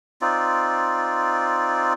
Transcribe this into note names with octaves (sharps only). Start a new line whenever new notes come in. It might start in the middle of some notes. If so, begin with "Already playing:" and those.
C4 D#4 F4 D5